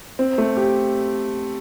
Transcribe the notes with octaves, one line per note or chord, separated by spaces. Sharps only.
C4
A3
G4